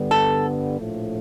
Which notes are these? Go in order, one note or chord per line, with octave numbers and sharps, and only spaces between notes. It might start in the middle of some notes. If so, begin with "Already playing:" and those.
Already playing: G2 D3 G3 B3
A4
A#1 A2 F3 A3